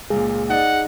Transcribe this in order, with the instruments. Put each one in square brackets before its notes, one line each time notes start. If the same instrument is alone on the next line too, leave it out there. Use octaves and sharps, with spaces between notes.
[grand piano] C#2 A#2 [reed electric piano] G#4
[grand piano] D#4 D5 D#5 [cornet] F#5